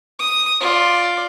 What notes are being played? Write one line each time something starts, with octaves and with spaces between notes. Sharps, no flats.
D#6
F4 D5